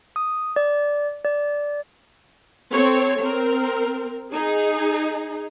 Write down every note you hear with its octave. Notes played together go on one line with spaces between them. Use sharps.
D#6
D5
D5
C4 A4 C#5
C4 A#4
D#4 G#4